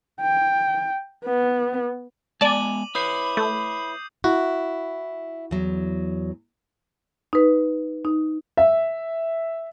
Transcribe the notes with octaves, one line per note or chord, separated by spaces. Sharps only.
G5
B3
G#3 B3 D5 G#5 A5 D6 D#7 F#7
E4 B4 C#5 B5 D#6 G6 C7
A3 G6
E4 F#4
E2 F#3
D#4 B4
D#4
E5